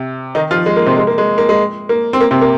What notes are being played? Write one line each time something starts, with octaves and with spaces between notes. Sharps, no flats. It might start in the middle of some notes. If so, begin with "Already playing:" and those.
Already playing: C3
D#3 D#4
F3 F4
G#3
A#3
C3 C4
G#3
A#3
G#3
A#3
G#3
A#3
C4
A#3
C3 C4
A#3